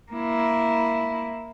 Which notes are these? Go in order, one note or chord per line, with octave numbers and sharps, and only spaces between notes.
A#3 E4